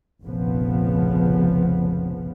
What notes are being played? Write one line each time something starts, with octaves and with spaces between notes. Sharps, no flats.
F1 A#1 C#3 F3 B3